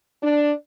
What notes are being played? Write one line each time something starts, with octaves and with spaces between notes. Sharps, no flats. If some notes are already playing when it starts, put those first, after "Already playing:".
D4